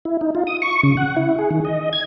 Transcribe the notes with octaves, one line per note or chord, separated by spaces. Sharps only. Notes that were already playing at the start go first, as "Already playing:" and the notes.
E4
D#4
F4
D#6
C#6
C#3
F#5
E4
G#4
D#3
D#5
G#6